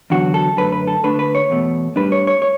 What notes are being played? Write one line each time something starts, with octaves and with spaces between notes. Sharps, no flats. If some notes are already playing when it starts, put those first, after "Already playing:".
E2 D3 F#3 F#4
A4
F#2 D3 A3 B4
B4
A4
D3 A3 D4 B4
B4
C#5
E2 B2 A3
A2 G3 D4 B4
C#5
C#5
C#5